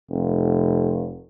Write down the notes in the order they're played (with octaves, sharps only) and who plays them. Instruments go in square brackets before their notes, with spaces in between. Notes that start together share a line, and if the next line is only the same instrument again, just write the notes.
[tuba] F1